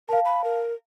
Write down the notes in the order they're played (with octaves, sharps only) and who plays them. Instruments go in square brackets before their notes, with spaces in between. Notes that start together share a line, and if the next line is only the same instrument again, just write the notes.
[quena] A#4 [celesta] F5 A5
[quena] B5
A#4